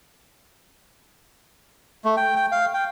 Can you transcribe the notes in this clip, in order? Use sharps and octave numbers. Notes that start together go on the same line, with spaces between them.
A3
G5
G5
F5
G5